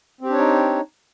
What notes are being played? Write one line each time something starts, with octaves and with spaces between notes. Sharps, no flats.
C4 D4 D#4 G4 C#5